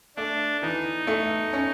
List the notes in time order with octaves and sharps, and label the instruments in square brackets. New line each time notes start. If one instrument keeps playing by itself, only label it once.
[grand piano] A3 [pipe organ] D4
[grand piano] E3 [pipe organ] D#4
[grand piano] A3
C#4